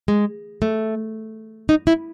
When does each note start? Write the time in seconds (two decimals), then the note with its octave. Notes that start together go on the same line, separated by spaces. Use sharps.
0.08 G#3
0.62 A3
1.69 D#4
1.87 E4